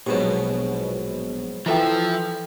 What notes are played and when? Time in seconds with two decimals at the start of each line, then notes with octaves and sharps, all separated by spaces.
0.06 A#1 G#2 B2 F#3 G4
1.66 E3 F3 E4 A4 E5 G5